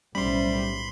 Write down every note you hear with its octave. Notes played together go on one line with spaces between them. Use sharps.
B1 A2 G3 C#4 C5 E5 B5 C6